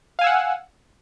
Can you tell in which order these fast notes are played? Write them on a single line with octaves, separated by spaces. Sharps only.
F5 G#5 E6 F#5